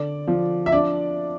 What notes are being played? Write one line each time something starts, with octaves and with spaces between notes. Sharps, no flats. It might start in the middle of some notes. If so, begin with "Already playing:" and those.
Already playing: D3 D5
F3
E5
D4 D5